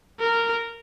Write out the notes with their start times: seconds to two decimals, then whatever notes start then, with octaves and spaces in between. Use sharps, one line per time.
0.20 A#4